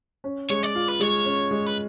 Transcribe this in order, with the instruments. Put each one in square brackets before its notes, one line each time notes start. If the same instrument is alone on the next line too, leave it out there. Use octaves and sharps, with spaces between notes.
[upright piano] C#4
[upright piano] G#3 [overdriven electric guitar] C#5
[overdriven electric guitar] D5
[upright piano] F4
[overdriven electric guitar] B4
[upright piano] G#3 [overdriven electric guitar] C#5
[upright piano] C#4
G#3
[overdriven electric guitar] B4